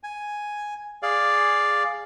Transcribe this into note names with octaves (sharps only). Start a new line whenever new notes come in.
G#5
G#4 D5 F5